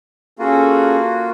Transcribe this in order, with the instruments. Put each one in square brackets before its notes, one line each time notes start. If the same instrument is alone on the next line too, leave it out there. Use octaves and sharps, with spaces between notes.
[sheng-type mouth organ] A#3 F4 F#4 [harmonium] C#4 G#4 A4